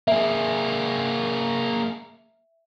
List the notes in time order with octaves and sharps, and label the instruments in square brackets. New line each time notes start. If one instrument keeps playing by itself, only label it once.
[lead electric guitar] A#3 G#4 [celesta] E5